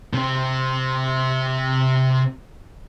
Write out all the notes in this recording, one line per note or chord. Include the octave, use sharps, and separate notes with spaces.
C3 C4